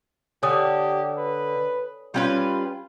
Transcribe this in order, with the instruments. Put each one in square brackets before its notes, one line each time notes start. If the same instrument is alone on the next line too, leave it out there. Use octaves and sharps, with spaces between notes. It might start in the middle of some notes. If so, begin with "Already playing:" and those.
[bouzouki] D3 [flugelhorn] G4 [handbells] C#5 G#5 D#6
[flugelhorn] B4
[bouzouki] G3 C#4 B4 [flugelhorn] F4